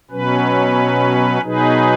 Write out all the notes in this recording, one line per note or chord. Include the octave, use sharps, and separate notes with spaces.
B2 F#3 C#4 B4
B2 F#3 D#4 G#4 B4